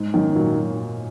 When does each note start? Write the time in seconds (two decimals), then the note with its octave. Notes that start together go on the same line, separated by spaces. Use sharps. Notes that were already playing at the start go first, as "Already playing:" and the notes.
Already playing: G#2
0.14 F#2 D#3
0.35 A#2 F#3